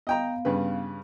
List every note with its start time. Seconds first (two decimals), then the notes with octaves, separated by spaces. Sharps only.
0.07 B3 D#5 F5 G5 A#5
0.45 G2 C#3 B4